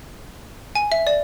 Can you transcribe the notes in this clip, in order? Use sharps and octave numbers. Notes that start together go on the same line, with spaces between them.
G#5
E5
D5